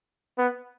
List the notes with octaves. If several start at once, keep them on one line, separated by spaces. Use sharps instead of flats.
B3